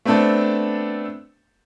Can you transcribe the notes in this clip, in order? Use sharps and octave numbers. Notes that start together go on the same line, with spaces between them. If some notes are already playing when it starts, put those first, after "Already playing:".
A3 B3 C4 D4 A4